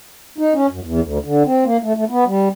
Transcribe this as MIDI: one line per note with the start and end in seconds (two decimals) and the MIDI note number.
0.38 0.53 63
0.54 0.67 61
0.70 0.80 42
0.83 1.00 40
1.01 1.18 38
1.24 1.43 50
1.45 1.64 60
1.65 1.77 58
1.82 1.93 57
1.96 2.04 57
2.10 2.24 59
2.26 2.48 55